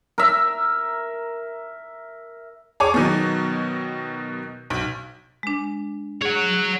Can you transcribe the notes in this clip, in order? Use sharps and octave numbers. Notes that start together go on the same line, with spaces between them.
A#4 E5
G#4 C#5 G#5 D6
B2 D#3 F#3
B1
G#3 D4
G#4 C#5 F#5